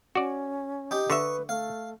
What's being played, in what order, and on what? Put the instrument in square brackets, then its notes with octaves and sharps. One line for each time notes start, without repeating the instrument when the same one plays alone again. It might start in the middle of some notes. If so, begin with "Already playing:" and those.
[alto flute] C#4 [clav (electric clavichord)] F#4 D5
[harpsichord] D#4 G4
[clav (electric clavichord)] D3 E5 [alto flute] B4 [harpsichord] C#6 D#6
[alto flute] A3 [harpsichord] F5